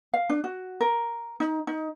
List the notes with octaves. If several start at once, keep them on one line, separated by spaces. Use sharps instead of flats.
F5
D4
F#4
A#4
D#4
D#4